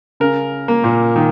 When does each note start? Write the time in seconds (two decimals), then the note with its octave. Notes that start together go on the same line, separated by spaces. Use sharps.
0.20 C#3 A#4
0.68 A#3
0.84 A#2
1.16 D#3